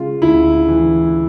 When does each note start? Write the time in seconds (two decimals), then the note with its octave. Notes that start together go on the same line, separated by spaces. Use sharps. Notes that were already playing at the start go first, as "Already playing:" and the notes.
Already playing: C#3 G#3 F4
0.22 D2 E4
0.68 E3